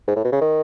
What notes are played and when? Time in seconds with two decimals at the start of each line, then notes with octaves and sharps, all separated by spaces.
0.08 G#2
0.16 A2
0.25 B2
0.32 C#3
0.41 D#3